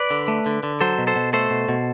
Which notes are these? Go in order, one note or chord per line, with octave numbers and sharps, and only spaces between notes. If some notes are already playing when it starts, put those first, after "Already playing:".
Already playing: B4 D5
D3
A3
D3
D3
F#3 A4 C5
B2
A4 C5
B2
A3 A4 C5
B2
B2